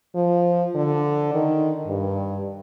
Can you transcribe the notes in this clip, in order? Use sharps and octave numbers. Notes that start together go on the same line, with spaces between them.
F3
D3
D#3
G2